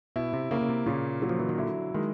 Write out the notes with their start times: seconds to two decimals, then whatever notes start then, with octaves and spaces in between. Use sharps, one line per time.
0.16 B2 E4
0.33 C3
0.51 C#3 A#3
0.61 C#3
0.69 C3
0.86 A#2 C#3
1.22 F#3
1.29 F3
1.39 E3
1.49 D#3
1.58 D3 E4
1.94 D#3 G#3